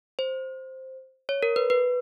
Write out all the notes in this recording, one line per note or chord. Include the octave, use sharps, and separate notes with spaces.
C5
C#5
A#4
B4
B4